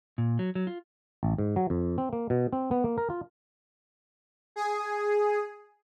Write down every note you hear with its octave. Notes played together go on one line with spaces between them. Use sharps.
A#2
F#3
F#3
F4
A1
G#2
F#3
F2
C4
A#3
B2
C4
B3
A#3
A#4
F4
G#4